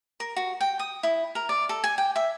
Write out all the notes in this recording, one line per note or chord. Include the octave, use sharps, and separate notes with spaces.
A#4
F#4
G5
D#6
E4
A#4
D5
A4
G#5
G5
E5